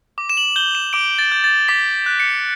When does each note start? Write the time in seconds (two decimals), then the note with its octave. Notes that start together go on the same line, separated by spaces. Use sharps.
0.18 D6
0.29 E7
0.37 F#7
0.56 G6 G7
0.75 E7
0.93 D6 D7
1.19 A6
1.32 G6
1.44 A6
1.68 D6 B6
2.06 F#6
2.20 C#7